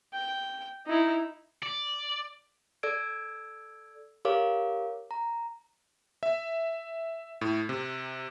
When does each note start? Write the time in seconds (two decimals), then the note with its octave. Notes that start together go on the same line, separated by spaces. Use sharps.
0.13 G5
0.87 D#4 E4
1.63 D5
2.83 A4 D5 E6 G#6 D7
4.25 G4 A#4 C#5 F5 D6
5.11 A#5
6.23 E5
7.41 A2
7.69 C3